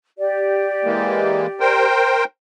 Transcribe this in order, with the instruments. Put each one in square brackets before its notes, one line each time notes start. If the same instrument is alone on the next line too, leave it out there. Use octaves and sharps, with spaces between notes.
[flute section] G4 D5
[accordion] E3 G#3 A#3
A#4 C5 G5